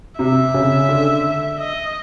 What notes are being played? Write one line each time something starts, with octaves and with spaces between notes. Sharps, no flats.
C3 E5
C#3
D3
D#5